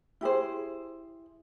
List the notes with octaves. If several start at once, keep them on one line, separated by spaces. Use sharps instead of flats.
E4 G4 G#4 C5